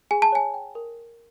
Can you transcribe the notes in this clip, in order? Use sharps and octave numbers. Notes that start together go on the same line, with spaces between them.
G#4 G#5
A5
C#5 G#5
G5
A#4